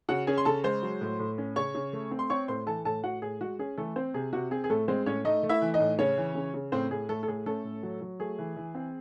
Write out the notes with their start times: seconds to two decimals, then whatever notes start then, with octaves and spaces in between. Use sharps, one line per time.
0.09 C#3 F#4 F#5
0.27 C#4 G#4 G#5
0.38 C6
0.45 C#3 A4 A5
0.64 G#3 C5 C6
0.83 F#3
1.01 A2
1.19 A2
1.38 C#4
1.56 C#3 C#5 C#6
1.75 C#3
1.93 A3
2.11 C4
2.19 C6
2.30 C4 C#5 C#6
2.48 A2 C5 C6
2.67 E3 A4 A5
2.85 A2 A4 A5
3.04 A2 F#4 F#5
3.22 A2 G#4
3.41 G#3 F#4
3.59 C#4 G#4
3.78 E3 A3 A4
3.96 C4 C5
4.14 C3 G#4
4.33 C3 F#4
4.51 C4 G#4
4.64 G#4
4.70 A2 A3 A4
4.88 G#3 C4 C5
5.06 A2 C#4 C#5
5.25 A3 D#4 D#5
5.43 A3
5.49 E4 E5
5.62 E3
5.74 D#4 D#5
5.80 A2
5.98 C#3 C#4 C#5
6.18 E3
6.35 C#3
6.54 C#3
6.72 A2 C4 C5
6.91 A2 G#4
7.09 A2 A3 A4
7.23 A4
7.28 A2 G#4
7.46 A3 C#4 A4
7.64 A2
7.83 F#3
8.01 F#3
8.20 A3 G#4
8.39 E3
8.57 E3
8.75 C4